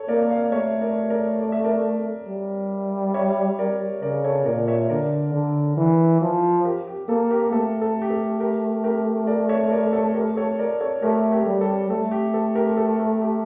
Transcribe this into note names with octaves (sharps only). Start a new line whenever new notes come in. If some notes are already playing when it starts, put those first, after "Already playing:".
Already playing: A4 C#5
A#3 A#4 D5
D5 F5
A3 C#5 E5
A#4 D5
A#4 D5
D5
E5
A#4 D5
G3
C#5 E5
A#4 D5
C#3 A#4 D5
A4 C#5
A#2 A#4 D5
C#5 E5
D3 A#4 D5
D3
E3
F3
G4 A#4
G4
A#3 A4
G4 A#4
A3 A4
A4
G4
A4
G4 A#4
G4 A#4
A#4 D5
C#5 E5
A#4 D5
A4 C#5
G4 A#4
A4 C#5
A#4 D5
A4 C#5
A3 G4 A#4
G4 A#4
G3
A4
A3 A4
G4
A4
G4 A#4
A4
A4
G4